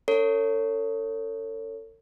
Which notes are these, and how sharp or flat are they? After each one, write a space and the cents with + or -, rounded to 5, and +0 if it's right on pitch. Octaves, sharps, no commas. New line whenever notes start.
D4 -25 A4 +45 C#5 +0